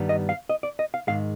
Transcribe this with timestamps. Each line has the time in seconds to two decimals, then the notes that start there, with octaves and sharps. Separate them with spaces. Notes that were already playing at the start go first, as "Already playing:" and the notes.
Already playing: G2 D#3 G3 B3
0.09 D#5
0.29 F5
0.49 D#5
0.63 D5
0.79 D#5
0.94 F5
1.07 G#2 D#3 G#3 F5